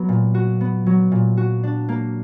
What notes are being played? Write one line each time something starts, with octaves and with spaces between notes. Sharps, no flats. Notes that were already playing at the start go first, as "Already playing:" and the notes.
Already playing: F#3 B3
A#2
F#4
B3
F#3
A#2
F#4
D4
A#3